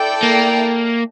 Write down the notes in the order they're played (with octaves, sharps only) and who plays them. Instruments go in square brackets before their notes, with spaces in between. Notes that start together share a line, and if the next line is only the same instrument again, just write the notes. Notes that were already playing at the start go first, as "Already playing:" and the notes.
Already playing: [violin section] E4 A4 D5 G5
[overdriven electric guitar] A#3